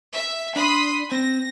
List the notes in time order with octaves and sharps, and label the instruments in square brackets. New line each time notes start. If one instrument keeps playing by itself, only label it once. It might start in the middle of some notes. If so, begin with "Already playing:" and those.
[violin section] E5
[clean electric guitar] D4 [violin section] B5 C6 D#6
[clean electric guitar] C4 [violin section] A#6